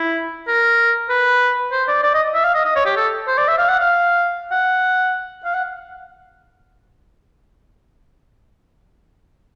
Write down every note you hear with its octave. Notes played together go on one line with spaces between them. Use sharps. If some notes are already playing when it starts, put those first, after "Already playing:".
Already playing: E4
A#4
B4
C5
D5
D5
D#5
E5
F5
D#5
D#5
C#5
G4
A4
C5
D5
E5
F5
F#5
F5
F#5
F5
F#5